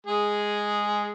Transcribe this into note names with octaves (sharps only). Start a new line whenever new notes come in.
G#3 G#4